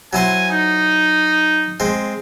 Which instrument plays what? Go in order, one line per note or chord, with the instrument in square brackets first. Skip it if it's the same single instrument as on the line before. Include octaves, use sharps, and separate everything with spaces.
[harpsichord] F#3 E4 C5 [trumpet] G#5
[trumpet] D#4
[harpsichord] G#3 C4